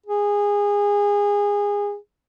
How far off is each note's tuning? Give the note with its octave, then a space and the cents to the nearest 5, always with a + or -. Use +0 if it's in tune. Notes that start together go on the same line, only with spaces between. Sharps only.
G#4 -25